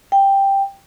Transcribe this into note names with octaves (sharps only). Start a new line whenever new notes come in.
G5